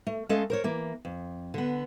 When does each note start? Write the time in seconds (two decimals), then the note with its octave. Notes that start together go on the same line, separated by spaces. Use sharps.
0.07 A3
0.29 G#3 A3 C#4 A4 D#5 F5
0.50 A#4 C5 C#5
0.64 E3 A#3
1.05 F2
1.54 D3 B3